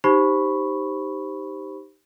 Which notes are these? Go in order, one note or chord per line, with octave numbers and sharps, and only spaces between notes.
D#4 G4 C5 B5 C#6